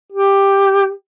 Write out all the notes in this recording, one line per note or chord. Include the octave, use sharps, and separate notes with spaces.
G4